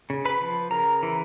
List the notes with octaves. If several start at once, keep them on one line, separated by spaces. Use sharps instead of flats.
C#3
B4 B5
F3
C#3 A#4 A#5
E3